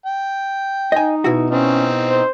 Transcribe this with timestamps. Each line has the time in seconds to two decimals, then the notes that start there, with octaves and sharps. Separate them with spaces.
0.06 G5
0.92 D#4 D#5 G#5
1.24 B2 E4 F#4
1.50 C4 C#4 D#4
2.06 C5